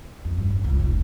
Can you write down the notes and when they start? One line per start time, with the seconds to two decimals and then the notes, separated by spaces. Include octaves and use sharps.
0.25 F2
0.38 G2
0.50 D1
0.64 C#2
0.80 F1